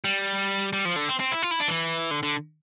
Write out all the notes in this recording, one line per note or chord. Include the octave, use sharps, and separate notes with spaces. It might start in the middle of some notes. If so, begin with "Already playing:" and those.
G3
G3
F3
D3
C4
C4
E4
F4
E4
D4
E3
D3
D3